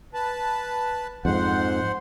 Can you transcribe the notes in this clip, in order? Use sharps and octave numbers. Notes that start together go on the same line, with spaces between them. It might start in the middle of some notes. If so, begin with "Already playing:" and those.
B4 A5
F2 G#2 C5 F#5